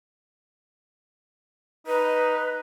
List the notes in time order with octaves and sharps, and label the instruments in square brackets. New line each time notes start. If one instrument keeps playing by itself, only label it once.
[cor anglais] D#4 [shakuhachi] B4